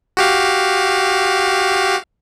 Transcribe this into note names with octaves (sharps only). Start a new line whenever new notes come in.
F#4 G4 F5